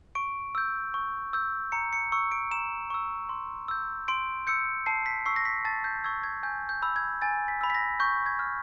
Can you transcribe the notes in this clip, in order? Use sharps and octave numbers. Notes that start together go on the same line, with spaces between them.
C#6 D7
E6 G6
C#6
E6 G6
A#5 C#7
C#7
C#6 E6 C#7
D7
A#5 E7
C#6 E6
C6
E6 G6
C6 D7
E6 G6 C#7
A5 C7
B6
C#6 E6 C7
A#6
B6
A5 A6
G6
C#6 E6 G#6
G#6
G#5 G6
G6
B5 E6
G#6
G#5 A6
B6
B5 E6
B6
A#6
C#6 G6
G#6
F6